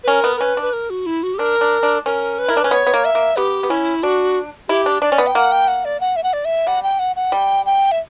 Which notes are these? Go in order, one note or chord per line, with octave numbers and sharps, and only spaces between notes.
B4
C#4 A#4
B3
A#4
C#4 B4
D4 B4
A#4
F#4
E4
F#4
G4
D4 A#4
D4
D4
C#4 A#4
B4
E4 A#4
D4
C#4 B4
B3 C#5
B3
A#3
E5
A#3
B3 G4
B3
C#4 E4
D4 F#4
E4 G4
D4
D4 D5
C#4
B3
G5
A#3 F#5
G5
F#5
D5
F#5
E5
F#5
D5
E5
G3 F#5
G5
F#5
F#5
G3 G5
G5
E5